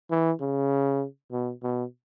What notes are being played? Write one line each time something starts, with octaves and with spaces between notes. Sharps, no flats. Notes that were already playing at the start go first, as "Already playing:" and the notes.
E3
C#3
B2
B2